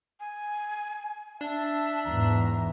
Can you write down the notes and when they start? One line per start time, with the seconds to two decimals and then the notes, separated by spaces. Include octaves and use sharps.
0.20 G#5
1.41 D4 E5 A5
2.05 E2 G#2 A#5